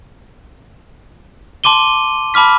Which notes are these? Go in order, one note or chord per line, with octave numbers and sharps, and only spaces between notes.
A5 C6 D6 D#7 G7
A5 B5 D6 F6 B6